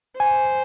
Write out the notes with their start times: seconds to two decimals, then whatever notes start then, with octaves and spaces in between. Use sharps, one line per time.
0.20 C5 G#5